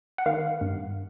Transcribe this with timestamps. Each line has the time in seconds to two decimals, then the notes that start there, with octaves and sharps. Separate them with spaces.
0.18 F#5
0.26 D#3 F5
0.61 G2